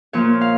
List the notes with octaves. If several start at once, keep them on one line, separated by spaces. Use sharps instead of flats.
A#2 F3 A#3 C#5
F5